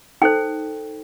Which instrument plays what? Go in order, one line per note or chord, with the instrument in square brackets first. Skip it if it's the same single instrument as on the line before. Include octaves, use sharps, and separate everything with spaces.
[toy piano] D#4 A4 C5 G5